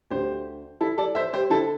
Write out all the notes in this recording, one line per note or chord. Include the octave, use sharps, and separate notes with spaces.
D2 D3 G4 C5
E4 A4
A4 D5
C5 E5
G4 C5
D3 E4 A4